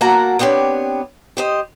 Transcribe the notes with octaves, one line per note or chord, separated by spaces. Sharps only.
A#3 F#4 A#4 F#5 A5 A#5
B3 C4 D4 G4 C#5
G4 C5 D#5